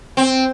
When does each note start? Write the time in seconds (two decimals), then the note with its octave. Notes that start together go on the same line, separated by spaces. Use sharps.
0.17 C4